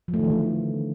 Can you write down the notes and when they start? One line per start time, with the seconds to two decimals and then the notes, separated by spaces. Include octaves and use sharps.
0.08 F3
0.14 A3
0.19 D#3
0.25 E3
0.30 D3